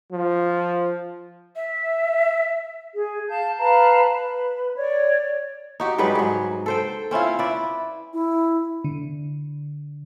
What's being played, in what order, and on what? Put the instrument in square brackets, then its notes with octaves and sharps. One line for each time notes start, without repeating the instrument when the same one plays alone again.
[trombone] F3
[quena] E5
[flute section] G#4
F5 A5 G6
B4 F5 A5 A#5
B4
C#5 D5
[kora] D#4 F#4 G4
G#2 F#3 G3 B4
G#2 F#3
A4 C5 G5
C4 C#4 E4 F4
E4 B4 D5
[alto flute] E4
[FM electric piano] D3